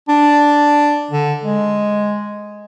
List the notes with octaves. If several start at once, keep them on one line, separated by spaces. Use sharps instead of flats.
D4
D3
G#3